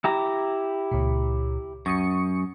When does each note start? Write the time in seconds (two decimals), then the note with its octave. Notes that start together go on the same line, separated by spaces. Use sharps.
0.04 E4 G4 A#5
0.91 C#2 A#2
1.86 F#2 C#6 D#6 C#7